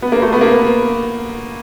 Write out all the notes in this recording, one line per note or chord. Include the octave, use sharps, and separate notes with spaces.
B3
A#3
A3
B3
A#3
B3